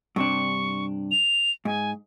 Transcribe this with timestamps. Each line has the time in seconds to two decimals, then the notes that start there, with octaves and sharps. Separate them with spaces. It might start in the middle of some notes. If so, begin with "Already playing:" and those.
0.16 G2 C3 D4 C#6
1.11 F7
1.65 G#2 G#5